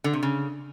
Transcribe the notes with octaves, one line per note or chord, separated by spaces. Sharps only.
D3
C3
C#3